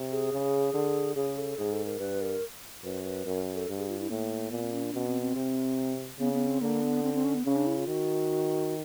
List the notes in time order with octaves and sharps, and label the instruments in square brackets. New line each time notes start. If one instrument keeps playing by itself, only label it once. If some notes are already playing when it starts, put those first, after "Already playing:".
Already playing: [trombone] C3
[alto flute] G#4
[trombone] C#3
D3
[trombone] C#3 [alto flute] G#4
[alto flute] A4
[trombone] G#2 [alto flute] G#4
[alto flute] A4
A#4
[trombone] G2 [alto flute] B4
[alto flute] A#4
[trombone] F#2 [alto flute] B4
[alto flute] B4
[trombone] F#2 [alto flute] A#4
[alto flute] A4
[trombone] G2
[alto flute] G#4
F4
E4
[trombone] A2 [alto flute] A#3
[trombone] A#2 [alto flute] B3
[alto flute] C4
C#4
D4
[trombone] B2 [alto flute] C#4
[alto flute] C4
C4
[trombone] C3
[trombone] C#3 [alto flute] B3
[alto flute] B3
C4
[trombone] D3 [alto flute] A#3
[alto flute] B3
C4
C4
C#4
B3
[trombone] C#3 [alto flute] C#4
[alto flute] D4
E4
F4
[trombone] D#3 [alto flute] F#4